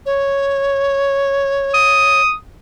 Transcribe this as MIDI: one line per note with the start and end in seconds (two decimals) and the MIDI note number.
0.06 2.21 73
1.74 2.33 87